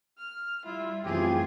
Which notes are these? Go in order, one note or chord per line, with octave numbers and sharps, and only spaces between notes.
F6
G3 E4 F4
F#2 E3 A3 C4 F4 G4 G#4